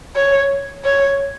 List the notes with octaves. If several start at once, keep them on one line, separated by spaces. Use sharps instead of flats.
C#5
C#5